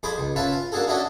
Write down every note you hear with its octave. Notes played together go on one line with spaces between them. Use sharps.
F2 G#4 C5 B5 D6
C#2
C#4 F4 B4 E5 A5
F4
A#3 D4 F#4 G#4 A4
C#4 D4 E4 F#4 A4 D#5